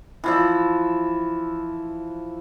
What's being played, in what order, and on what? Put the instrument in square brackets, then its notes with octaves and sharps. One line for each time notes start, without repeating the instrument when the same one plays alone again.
[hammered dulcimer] E3 F3 E5